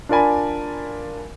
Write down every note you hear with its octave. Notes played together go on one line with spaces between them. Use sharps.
D4 F4 A#4 D5 G#5 B5